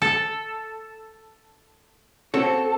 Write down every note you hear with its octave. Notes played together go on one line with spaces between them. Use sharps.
A4
C4 F#4 A4 C#5